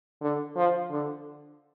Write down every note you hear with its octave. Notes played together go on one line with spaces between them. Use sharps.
D3
F3
D3